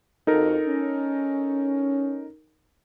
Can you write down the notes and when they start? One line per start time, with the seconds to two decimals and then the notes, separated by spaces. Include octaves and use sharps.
0.27 F2 D#4 F#4 A4 A#4
0.64 C#4